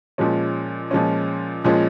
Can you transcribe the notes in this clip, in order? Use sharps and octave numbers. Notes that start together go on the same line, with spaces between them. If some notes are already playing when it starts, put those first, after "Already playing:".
A#2 F3 G#3 C#4
A#2 F3 G#3 C#4
A#2 F3 G#3 C#4